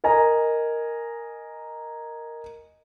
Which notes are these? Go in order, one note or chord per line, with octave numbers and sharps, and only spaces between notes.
A#4 D#5 G#5 A#5